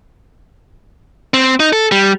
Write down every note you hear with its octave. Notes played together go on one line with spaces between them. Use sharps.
C4
D#4
A4
G3